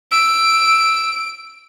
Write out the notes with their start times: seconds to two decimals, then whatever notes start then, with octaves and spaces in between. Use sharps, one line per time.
0.12 E6 D7